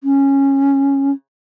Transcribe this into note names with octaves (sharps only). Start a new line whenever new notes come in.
C#4